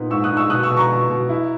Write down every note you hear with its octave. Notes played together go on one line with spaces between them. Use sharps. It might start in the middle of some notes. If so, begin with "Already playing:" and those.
Already playing: A#2 B3 D#4
G#2 C#6 E6
D#6 F#6
D#4
C#6 E6
B2 D#6 F#6
C#6 E6
B2
A#5 C#6
B2
B2
E4